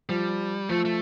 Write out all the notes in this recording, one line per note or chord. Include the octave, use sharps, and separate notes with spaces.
F3 G3
F3 A3
A3